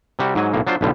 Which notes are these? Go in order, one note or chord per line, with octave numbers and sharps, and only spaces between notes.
C3 G3 F#4
G#2 F#3 G#5
B1 A2 A#3
F#3 D4 F4 C5
B1 A2 D3 G3